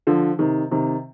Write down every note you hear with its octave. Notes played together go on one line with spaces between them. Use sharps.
D3 F3
C3 D#3
C3 D#3